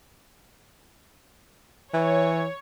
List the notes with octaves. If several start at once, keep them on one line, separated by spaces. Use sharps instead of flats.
E3 C#5